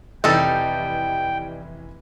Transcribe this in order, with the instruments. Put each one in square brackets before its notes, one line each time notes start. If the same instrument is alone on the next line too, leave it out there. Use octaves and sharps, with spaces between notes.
[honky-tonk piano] F1 E3 [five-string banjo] G3 D#4 A4 [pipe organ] G5